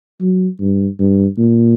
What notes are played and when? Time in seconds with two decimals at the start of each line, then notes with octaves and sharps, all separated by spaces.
0.21 F#3
0.60 G2
0.99 G2
1.38 A#2